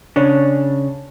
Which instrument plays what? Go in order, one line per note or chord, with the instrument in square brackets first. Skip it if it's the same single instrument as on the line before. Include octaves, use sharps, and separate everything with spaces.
[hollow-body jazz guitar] C#3 C#4 D4